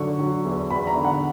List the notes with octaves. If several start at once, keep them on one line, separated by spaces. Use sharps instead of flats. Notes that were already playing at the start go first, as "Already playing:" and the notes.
Already playing: D3 F#3 C#6
F#3
E2
E2 B5
A#5
D3
F#5